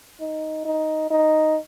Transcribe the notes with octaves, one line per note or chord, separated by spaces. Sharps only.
D#4
D#4
D#4